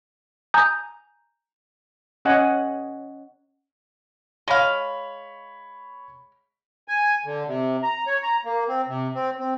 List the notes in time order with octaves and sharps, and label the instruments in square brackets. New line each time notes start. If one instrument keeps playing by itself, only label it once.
[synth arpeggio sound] G#5 A#5 D#6 G6
[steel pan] C#4 D#5 F#5 G#5
[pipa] G#3 F5 [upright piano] C#5 B5
[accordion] G#5
D3
C3
A#5
C#5
A#5
A#3
C4
C3
C4
C4